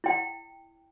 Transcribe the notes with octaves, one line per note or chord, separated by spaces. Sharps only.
E4 G5